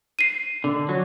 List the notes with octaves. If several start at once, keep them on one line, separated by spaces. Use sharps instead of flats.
C7 D#7
D3
F#3